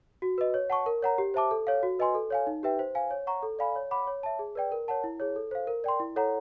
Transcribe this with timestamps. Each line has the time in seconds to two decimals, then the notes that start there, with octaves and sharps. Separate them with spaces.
0.22 F#4
0.38 B4 D#5
0.54 C#5
0.70 F#5 A5 C#6
0.86 A#4
1.03 C#5 F#5 A#5
1.18 G4
1.34 C5 E5 A5 D6
1.51 A4
1.67 C#5 F5
1.83 F#4
1.99 B4 D#5 G#5 C6
2.15 A4
2.30 C#5 F5 G#5
2.47 D#4
2.63 G4 B4 E5 G5
2.79 C5
2.95 F5 G#5
3.11 C#5
3.27 F#5 A#5 C#6
3.43 A4
3.59 D5 F5 G#5 B5
3.76 C#5
3.91 F#5 B5 D6
4.07 C#5
4.23 E5 A5
4.39 G#4
4.55 B4 D5 G5
4.72 A#4
4.88 C#5 F#5 A5
5.04 E4
5.20 G#4 C#5
5.36 A4
5.51 C5 F5
5.67 A#4
5.84 D5 G5 C6
6.00 E4
6.16 A4 C#5 F#5 A#5